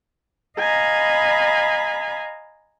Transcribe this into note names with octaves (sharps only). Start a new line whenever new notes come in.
D#5 F5 G#5 A#5 B5